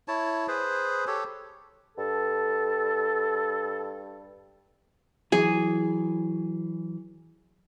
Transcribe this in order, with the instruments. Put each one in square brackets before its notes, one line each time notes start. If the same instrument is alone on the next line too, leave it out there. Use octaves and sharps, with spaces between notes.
[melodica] E4 C#5 A5
G#4 B4 C5
G4 A4 C#5
[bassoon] G2 [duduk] A4
[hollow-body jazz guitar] E3 F#3 [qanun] G#4